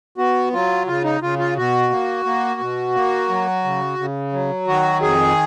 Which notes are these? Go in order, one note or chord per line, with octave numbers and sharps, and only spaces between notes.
B3 F#4
F#3 F4
C#3 F4
D#4
C#3 F4
F4
B2 F#4
A#3
A#3
B2
A#3
F#3
C#3
C#3
F#3
D#3 F#4
F2 G#4